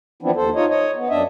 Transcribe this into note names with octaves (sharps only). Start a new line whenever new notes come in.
E3 F3 B3 C4 D4 E4
D#2 A4 C5
D#4 F4 C#5 D#5
C#5 D#5
B3
F#2 D4 D#5 E5